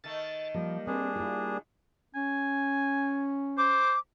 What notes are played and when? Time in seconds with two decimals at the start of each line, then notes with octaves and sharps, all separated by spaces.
0.04 D#3 A3 A6
0.54 F3 G3 A#3
0.87 C4 D4 G#4 A#4 B4
1.16 E4 F4
2.15 C#4 G#5
3.58 C5 D6